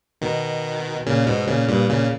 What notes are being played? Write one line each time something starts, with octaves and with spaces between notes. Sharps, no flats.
B2 D#3
A#2 C#3
G#2 B2
A#2 C#3
G2 A#2
A#2 C#3